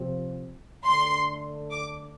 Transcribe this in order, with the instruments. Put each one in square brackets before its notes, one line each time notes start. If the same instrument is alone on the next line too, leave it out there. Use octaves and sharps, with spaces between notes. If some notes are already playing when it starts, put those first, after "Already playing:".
Already playing: [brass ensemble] C3 F3 C4
[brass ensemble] D3 A3 D4 A4 [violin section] C6
[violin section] D6